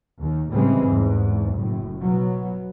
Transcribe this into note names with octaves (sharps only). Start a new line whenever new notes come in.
D#2 D#3
A2 C#3 E3 G3 G#3 C4
E2 G#2
F#1 A2
B2 F#3 B3